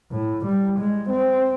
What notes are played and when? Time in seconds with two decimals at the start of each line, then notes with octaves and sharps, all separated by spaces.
0.12 A2
0.45 G3
0.79 G#3
1.09 C4